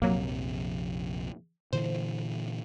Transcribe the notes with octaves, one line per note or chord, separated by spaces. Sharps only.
A#1 F2 C3 F#3 A#3
A#2 D3 E3 C5